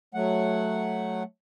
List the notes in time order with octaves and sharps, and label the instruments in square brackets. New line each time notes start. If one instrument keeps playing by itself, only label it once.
[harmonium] F#3 A3 F#5